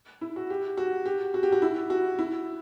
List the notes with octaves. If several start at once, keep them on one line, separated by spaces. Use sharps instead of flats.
E4
F#4
G4
F#4
G4
F#4
G4
F#4
E4
F#4
E4